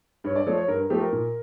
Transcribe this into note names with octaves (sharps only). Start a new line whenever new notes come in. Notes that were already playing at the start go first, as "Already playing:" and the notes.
G2 C#5
D5
F3 A3 C#5
C#5
G2 A#4
F3 A3 G4
A#4
A#2